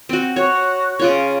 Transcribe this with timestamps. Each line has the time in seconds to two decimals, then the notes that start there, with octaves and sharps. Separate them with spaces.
0.09 C4 F#4
0.36 F#4 C#5
0.99 C#3 F4 C#5